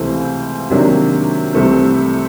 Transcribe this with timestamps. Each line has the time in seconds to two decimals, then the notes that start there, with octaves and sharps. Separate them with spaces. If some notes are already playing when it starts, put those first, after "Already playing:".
Already playing: C#2 C3 E3 A3 C4
0.70 C3 D#3 F#3 A#3 D4
1.53 C2 C3 E3 A3 C4